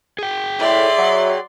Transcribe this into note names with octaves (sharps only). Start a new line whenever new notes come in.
G#4 G5
A2 D5 E5 C6
F#3